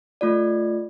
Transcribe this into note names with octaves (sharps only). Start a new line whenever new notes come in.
A3 F4 D5